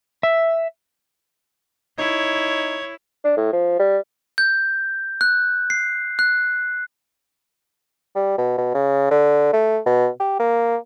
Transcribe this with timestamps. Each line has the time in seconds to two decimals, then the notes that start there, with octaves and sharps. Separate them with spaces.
0.23 E5
1.98 D#4 E4 C#5
3.24 D4
3.37 A2
3.53 F3
3.79 G3
4.38 G6
5.21 F#6
5.70 C7
6.19 F#6
8.15 G3
8.38 B2
8.58 B2
8.74 C#3
9.11 D3
9.53 A3
9.86 B2
10.20 G4
10.39 A#3